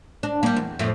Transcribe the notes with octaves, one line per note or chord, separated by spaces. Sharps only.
D4
G3 A#3
E2
F2 A2 A3